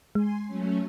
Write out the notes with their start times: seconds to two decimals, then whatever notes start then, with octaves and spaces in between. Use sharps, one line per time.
0.15 G#3 G#5 C6
0.47 F#3 A3 C#4